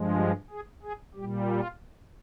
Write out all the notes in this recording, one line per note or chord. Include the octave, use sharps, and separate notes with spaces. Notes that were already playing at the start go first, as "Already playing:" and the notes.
Already playing: G2 F3 G#3
G4
G#4
G#4
A#2 G3 G4
F4